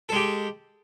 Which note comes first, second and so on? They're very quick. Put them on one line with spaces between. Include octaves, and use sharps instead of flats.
A4 G#3 G4